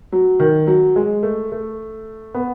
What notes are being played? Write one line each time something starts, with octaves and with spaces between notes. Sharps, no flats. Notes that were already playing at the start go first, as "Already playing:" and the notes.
F#3
D#3
F#3
G#3
A3
A3
B3